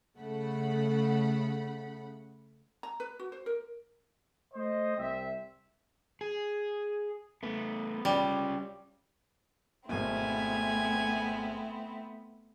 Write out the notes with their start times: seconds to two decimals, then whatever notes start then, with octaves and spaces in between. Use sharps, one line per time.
0.17 C#3 A3 F#5 B5
2.83 A#5
3.00 B4
3.19 F#4
3.32 C5
3.46 A#4
4.53 A3 C5 D#5
4.97 C2 C4 E5
6.21 G#4
7.43 A3 B3
8.05 G3 C#4 F4
9.89 G#1 B2 A3 B3 C4 E4 G#5